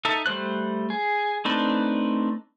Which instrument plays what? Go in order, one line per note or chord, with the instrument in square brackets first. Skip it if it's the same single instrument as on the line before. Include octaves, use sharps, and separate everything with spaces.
[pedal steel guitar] D#4 A4 E5
G3 A3 C5 F#6
G#4
A3 C4 D4 D#4 B4